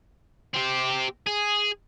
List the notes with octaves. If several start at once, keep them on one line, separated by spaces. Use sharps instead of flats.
C4 G4
G#4